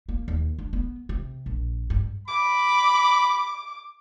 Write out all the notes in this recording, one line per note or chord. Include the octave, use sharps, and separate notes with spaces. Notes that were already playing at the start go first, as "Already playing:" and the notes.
A#3
D#2
D4
B3
C3
A#1
G2
B5 D6